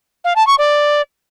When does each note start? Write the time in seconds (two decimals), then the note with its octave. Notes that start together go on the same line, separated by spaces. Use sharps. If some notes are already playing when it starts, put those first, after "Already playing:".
0.24 F5
0.36 A5
0.47 C#6
0.58 D5